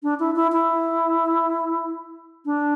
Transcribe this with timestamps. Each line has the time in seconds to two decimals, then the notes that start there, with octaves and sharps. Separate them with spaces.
0.03 D4
0.19 E4
0.35 E4
0.52 E4
2.45 D4